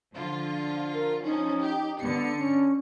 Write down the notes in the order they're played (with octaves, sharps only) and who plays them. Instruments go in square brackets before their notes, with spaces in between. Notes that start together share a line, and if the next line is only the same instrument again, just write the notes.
[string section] D3 F3 F4
[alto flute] A#4
[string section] F3 C#4 [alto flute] D#4
[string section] G4
[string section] D3 C#7 [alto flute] B3
[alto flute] C#4